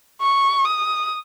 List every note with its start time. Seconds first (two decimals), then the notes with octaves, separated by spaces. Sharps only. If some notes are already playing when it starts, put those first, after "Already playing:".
0.21 C#6
0.65 D#6